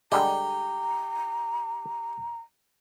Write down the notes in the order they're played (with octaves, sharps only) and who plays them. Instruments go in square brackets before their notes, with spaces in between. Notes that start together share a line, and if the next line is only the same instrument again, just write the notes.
[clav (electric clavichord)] D3 G3 G#3 [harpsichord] G4 [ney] A#5